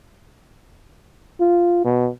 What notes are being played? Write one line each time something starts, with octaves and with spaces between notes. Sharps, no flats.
F4
B2